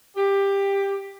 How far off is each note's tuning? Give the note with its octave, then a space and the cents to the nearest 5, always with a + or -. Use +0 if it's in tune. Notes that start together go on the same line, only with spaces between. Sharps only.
G4 +15